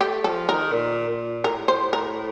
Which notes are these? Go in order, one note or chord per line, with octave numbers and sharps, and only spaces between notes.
A3 G4
F3 A4
D#3 A#4
A#2
A#2
A2 A#4
C5
A#4